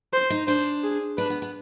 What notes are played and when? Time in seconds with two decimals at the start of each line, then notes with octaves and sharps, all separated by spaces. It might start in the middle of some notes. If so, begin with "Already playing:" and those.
0.13 C5
0.30 D#4
0.47 D4 C5
0.84 G#4
1.18 D4 B4
1.30 B3
1.42 B3